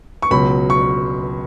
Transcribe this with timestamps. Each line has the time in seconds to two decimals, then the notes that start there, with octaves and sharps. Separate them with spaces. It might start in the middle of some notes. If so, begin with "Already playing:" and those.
0.22 C#6
0.31 C#2 B2 F#3 B5
0.70 C#6